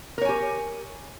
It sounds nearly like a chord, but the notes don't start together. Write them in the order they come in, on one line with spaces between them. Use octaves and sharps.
A#4 C#5 G#5 G4